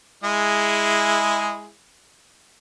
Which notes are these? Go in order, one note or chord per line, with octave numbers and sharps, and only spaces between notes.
G#3 E4 G#4